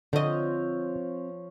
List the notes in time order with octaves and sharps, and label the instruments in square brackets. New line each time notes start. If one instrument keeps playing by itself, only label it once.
[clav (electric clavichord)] D3 [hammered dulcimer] F3 C#5 [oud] C4 D#5